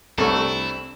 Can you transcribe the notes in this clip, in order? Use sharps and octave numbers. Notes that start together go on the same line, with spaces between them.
C2 A3 C4 D4 E4 A4 C#5